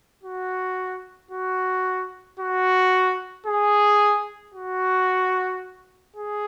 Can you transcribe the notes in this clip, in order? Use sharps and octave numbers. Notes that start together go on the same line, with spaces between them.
F#4
F#4
F#4
G#4
F#4
G#4